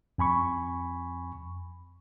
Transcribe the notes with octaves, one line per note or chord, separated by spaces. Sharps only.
F2 G#5 B5 C#6